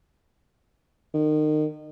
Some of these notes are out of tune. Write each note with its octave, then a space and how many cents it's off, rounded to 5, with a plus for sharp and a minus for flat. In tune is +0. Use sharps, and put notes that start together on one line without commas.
D#3 -30